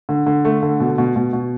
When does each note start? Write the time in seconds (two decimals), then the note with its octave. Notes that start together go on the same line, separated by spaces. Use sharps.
0.09 D3
0.26 D3
0.45 A3
0.63 D3
0.80 B2
0.98 B2
1.16 B2
1.33 B2